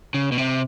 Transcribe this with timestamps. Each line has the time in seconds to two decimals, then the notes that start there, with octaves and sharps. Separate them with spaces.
0.14 C#3
0.32 B2
0.38 C3